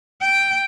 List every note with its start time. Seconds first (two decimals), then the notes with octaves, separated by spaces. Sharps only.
0.21 G5